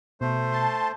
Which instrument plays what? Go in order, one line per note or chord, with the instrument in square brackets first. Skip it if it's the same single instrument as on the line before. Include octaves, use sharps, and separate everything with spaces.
[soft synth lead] B2 [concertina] A3 C5
[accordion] A5 C6